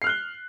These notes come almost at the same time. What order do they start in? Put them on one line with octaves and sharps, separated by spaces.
C7 F6 F#6 G7